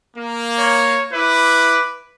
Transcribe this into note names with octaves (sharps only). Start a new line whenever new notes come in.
A#3
C#5
E4 B4 D6